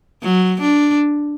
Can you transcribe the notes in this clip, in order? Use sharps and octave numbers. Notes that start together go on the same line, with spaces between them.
F#3
D4